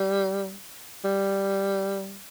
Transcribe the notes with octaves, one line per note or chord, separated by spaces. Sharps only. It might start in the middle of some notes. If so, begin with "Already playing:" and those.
Already playing: G3
G3